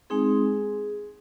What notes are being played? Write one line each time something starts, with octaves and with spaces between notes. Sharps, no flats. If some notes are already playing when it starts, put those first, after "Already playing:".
G#3 C4 D#4 G#4